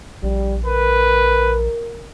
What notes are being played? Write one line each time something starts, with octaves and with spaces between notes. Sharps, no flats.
A#1 G3
A#4 B4